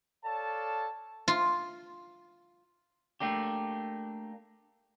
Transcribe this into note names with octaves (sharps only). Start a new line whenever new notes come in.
A4 C#5 D5 F5 A5
F4
A3 A#3 D4 G4